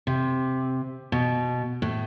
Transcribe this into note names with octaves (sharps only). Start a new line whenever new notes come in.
C3
B2
A2